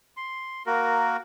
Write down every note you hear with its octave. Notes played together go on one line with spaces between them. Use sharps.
C6
A#3 F#4 A#4